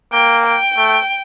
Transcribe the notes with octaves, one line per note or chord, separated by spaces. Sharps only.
A#3 G5
G5
A3